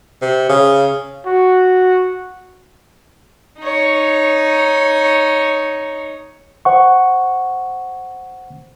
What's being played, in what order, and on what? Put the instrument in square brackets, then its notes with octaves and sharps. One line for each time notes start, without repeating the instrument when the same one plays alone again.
[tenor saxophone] C3
C#3
[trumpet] F#4
[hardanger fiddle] D#4 C#5
[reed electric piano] C5 F#5 C#6